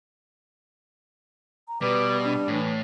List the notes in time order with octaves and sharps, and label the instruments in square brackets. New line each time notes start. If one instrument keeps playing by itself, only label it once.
[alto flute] A#5
[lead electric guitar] B2 [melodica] G3 [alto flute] B4 [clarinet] D6
[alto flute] D4
[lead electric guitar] A2 [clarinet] E3